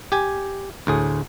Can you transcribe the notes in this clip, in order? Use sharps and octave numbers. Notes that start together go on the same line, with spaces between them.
G4 G#5
D2 A2 G#4